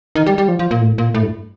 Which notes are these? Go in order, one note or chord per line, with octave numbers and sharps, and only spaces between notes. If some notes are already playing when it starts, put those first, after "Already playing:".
D#3
G3
G3
F3
F3
A#2
A2
A#2
A2
G2